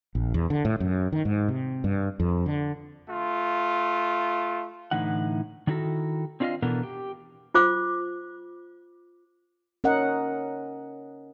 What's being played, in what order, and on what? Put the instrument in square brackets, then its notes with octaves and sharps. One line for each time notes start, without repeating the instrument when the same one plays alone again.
[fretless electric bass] A#1
E2
D3
A2
F#2
D#3
G#2
C3
G2
F2
D3
[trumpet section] A3 F4
[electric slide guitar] A2 D3 E3 D#4 F#5
D#3 D4 E4 F#4 A4 A#5
C4 D4 F4 C#5 D#5 F5
B2 E3 B3 D4 A4 A#4
G4
[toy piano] F4 C5 D6
[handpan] C#4 A#4 D#5 F#5